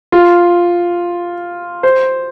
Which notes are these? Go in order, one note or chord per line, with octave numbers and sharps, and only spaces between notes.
F4
C5